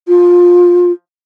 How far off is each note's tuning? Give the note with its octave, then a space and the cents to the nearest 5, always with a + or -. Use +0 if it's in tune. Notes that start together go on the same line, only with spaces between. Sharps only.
F4 +15